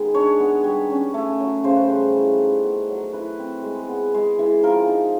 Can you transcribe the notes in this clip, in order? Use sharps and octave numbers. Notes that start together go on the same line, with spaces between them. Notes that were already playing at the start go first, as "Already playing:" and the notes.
Already playing: D#3 G#3 B3 G#4
D4 C#5
B3
G3
C#4
A3
F#3
C#3 C5
B4
G3 C5
E3
D#4
B3
F#3
E3 B4
C4
G#3
B3
G#3
E3
F3 A#4
D#4